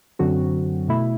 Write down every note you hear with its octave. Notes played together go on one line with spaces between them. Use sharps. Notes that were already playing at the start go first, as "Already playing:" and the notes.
F#2 D3 F#3 C4 F#4
B2 A3 E4